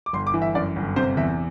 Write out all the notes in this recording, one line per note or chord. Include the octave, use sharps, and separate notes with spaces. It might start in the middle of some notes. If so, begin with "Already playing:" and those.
D6
G1 C6
D6
E3
E5
F#2 D5
G1
C3 C5
E2 E5